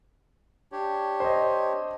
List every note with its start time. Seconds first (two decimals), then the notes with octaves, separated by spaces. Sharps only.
0.72 D4 G4 C#5
1.20 C5 D#5